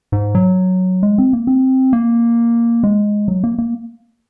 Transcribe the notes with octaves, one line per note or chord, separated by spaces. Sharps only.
G#2
F#3
G#3
C4
A#3
C4
A#3
G#3
F#3
A#3
A#3